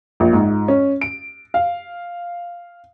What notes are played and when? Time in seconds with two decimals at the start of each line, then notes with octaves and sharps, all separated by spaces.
0.20 A#1
0.33 G#2
0.68 C#4
1.01 D7
1.54 F5